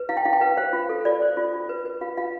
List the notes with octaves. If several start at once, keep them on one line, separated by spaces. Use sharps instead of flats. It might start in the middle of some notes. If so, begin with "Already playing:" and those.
Already playing: B4
E4 F5
G5
E4 F5
G5
B4 F5
C5 F5
F4
A4
F4 D5
C5
F4
F4
B4
B4
F4 F5
F4 F5